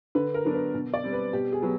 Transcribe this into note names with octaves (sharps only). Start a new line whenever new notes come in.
D3 B4
A#4
F#3 B3 D4
B4
B2
D5
G3 C4
B4
B2 G4
G#4
F#3 B3